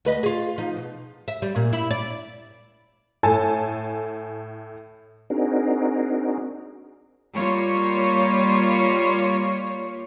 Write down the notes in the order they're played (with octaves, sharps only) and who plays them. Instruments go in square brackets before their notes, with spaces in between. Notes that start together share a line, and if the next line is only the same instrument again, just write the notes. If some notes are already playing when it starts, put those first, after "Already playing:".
[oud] D2 B4 D#5
F4 G#4
F3 D#4
B2
E5
G3
A#2
E4
D5
[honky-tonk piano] A2 A4 G#5 A5
[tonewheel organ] C4 D4 D#4 F#4 G#4 A#4
[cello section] G3 A#3 F4 C#5